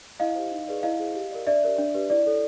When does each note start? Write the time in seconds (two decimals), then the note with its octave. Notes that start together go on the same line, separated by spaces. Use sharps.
0.20 E4 D#5 F5
0.35 G4 C5
0.51 D#4
0.67 G#4 B4 D5
0.83 E4 D#5 F5
0.99 G#4 C5
1.15 G4
1.31 A#4 D5
1.47 D4 D5 E5
1.63 G4 A#4 C#5
1.78 D4
1.94 G4 B4
2.10 E4 D5
2.26 A4 C#5